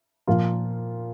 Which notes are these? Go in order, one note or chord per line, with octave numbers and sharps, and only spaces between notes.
A#2 F3 A#3 F4